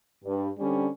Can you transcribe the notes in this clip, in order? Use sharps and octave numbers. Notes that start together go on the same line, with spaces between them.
G2
D3 G3 C4 C#4